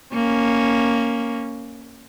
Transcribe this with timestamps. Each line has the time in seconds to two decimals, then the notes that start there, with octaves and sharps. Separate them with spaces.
0.13 A#3 C#4